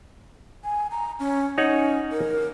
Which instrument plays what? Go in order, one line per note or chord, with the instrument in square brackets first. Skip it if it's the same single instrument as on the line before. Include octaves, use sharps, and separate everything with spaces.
[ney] G#5
A#5
C#4
[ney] C#4 [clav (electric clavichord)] D#4 C#5 F#5
[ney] A#4